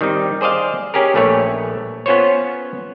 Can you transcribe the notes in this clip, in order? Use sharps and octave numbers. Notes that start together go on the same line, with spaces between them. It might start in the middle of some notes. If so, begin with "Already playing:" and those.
D#3 G3 C4 D#4
G#4 C5 D5 D#5 F5
C#4 G4 G#4 A#4
A#1 A3 B4 C#5
B3 C#4 F4 C5 C#5